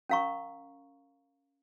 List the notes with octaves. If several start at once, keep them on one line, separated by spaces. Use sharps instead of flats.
C#4 A#4 F5 A#5 C#6